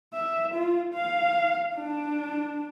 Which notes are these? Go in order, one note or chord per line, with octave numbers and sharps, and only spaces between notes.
E5
F4
F5
D4